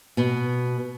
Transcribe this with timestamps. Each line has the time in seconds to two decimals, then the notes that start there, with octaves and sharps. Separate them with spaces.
0.17 B2